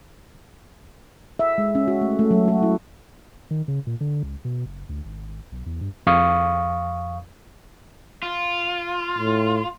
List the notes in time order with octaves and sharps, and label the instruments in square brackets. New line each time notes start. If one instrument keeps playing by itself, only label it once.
[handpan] E5
G#3
C#4
F#4
A3
A3
F#3
F#4
E4
[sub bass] D#3
C#3
A#2
D3
C#2
B2
F#1
D2
G#1
B1
E2
G2
[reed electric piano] F2 F5 C#6 D#6
[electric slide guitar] F4
[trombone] A2